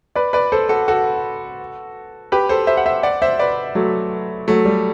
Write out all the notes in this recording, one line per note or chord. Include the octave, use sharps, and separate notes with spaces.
B4 D5
B4 D5
A4 C5
F#4 A4
F#4 A4
G4 B4
A4 C5
C5 E5
F#5
C5 E5
D5 F#5
C5 E5
B4 D5
F#3 A3
F#3 A3
G3